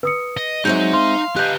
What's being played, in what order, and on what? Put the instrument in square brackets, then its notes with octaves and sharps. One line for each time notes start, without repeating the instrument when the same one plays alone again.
[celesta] B4 D#6 C#7
[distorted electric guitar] D#5
[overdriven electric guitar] F#3 [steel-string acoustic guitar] G#3 C4 E5 [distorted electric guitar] D#4 [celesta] G6
[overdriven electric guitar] F5 [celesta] C6
[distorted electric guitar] B3 G4 [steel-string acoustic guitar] D#5 [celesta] F#6 G6